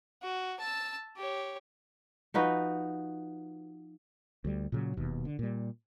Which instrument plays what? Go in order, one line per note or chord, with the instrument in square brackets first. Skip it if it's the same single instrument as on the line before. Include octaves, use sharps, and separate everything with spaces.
[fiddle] F#4
A5 E6
G4 C#5
[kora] F3 D#4 F#4 B4
[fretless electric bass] D2 G3
A#2 C#3 F#3
D#1 D#2 B2
D3
A#2 G3